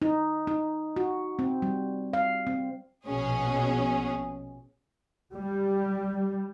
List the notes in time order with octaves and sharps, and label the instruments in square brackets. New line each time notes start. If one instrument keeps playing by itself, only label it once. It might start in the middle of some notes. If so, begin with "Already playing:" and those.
[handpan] D#4
D#4
F#4
C4
G3
F5
C4
[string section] A#1 B2 C#4 G#4
[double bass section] G3